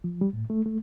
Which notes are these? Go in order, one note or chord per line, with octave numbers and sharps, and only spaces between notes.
F3
G3
A2
A3
A3